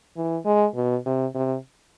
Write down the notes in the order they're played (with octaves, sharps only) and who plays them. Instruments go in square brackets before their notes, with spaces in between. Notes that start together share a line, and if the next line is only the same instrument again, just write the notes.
[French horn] E3
G#3
B2
C3
C3